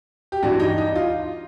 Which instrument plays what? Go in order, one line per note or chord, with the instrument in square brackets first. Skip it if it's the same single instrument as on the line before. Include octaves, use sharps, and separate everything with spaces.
[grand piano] G4
G2 E3 G3 F#4
D#4
D#4
F4